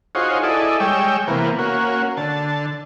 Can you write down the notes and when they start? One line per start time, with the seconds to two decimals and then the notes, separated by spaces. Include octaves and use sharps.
0.15 D#4 F4 F#4 G#4 C5 C#5
0.43 E4 G#4 A4 D5 D#5
0.80 G3 G#3 C#5 G5 E6
1.28 C3 E3 A#3 B3
1.59 A#3 C#4 F#4
2.17 D3 A5